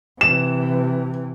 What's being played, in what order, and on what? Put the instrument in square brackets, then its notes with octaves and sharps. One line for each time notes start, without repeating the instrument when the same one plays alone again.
[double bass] C3 E3 [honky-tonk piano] E7